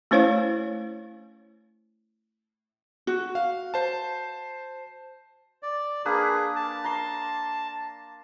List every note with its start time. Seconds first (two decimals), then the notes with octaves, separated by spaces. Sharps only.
0.11 A3 C#4 E4 C5 C#5 F5
3.07 F#4
3.35 F5
3.74 C5 A5
5.63 D5
6.05 A#3 D4 G#4 B4
6.56 A5
6.84 A#5 C6